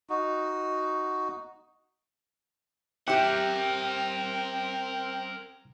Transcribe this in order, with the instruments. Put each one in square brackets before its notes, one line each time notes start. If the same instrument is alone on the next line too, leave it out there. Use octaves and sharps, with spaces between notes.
[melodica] D#4 F#4
[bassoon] C4 [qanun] G4 E5 [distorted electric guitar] A#4 F#5 [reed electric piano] G5 D6 F#6